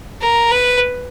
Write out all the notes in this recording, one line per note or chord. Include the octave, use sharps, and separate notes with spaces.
A#4
B4